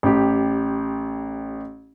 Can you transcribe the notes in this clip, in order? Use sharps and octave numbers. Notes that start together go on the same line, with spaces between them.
A1 G4